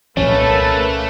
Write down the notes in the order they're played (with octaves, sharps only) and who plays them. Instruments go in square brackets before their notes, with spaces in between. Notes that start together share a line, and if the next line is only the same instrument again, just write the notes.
[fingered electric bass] C2 A#2 F3 [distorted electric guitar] A3 [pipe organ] A#3 A4 B4 [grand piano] C#4